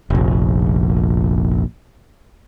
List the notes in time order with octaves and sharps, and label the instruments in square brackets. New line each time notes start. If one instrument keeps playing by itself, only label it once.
[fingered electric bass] F1 A#1